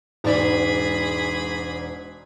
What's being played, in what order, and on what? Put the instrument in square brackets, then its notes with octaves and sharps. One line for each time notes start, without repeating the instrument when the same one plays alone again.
[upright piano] E1 G#2 D5 [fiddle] G#4 B5